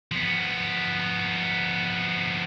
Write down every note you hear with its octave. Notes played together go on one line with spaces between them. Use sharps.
F3 B3